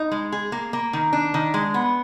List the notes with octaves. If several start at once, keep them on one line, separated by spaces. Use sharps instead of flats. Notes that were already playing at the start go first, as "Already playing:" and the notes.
Already playing: D#4
G#3
G#4
A#3
A#3
D#3
D4
D#3
G#3
B3